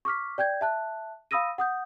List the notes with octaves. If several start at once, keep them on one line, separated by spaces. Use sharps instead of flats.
C#6 D6 F6 B6
D5 G5 G6 G#6
E5 A5 F#6
F5 B5 D#6 E6 A#6 D#7
F#5 D#6 G6